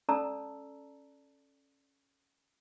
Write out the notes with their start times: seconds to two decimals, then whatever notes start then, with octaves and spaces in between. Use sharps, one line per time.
0.09 C#4 A4 D5 A5 A#5 E6